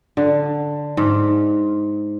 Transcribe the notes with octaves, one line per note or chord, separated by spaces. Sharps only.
D3
G#2